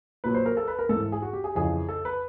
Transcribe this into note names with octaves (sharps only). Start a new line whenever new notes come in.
A#2 F#3 B4
C5
A#4
A4
B4
A#4
G#2 E3 A4
G#4
F#4
G4
G#4
F2 C#3 E3 G#4
A4
B4